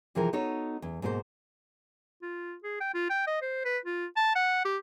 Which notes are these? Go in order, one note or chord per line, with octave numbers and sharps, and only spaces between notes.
C3 E3 F3 G#4 A#4
B3 D#4 F#4 A4 C#5
E2
G#2 B2 A#3 A#4 C5
F4
G#4
G5
F4
G5
D#5
C5
B4
F4
A5
F#5
G4